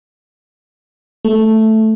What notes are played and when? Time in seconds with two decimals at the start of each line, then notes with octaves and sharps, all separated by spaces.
1.25 A3